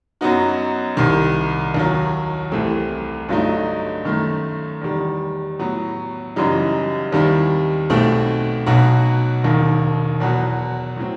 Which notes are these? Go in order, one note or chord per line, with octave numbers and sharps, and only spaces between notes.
F#2 F#3 B3 D#4 F#4
C2 C3 D#3
D#2 D#3 F#3
C2 C3 E3 A3 C4
G1 G2 F#3 A3 D#4
F#2 D#3 A3
E2 D#3 G3
A2 F#3 B3
F#1 F#2 E3 G3 D#4
D#2 D#3 G3 C4 E4
B1 B2 A3 C4
B1 B2 F#3 B3 F#4
E1 D#2 D#3
E2 B2 F#3 B3 F#4
A2 F#3 C4